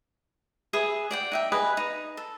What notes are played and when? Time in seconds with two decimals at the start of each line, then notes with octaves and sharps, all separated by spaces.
0.73 G#4 B4 E5 D#6
1.11 D5 F#5 G5
1.32 D#4 E5 G5
1.52 G#4 B4 D#5
1.77 D#4
2.17 A4